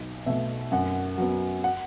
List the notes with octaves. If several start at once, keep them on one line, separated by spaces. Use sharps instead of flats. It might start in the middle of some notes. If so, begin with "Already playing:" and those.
Already playing: B1
B2 A3 E5
F#2 F#5
F#3 B3
F#5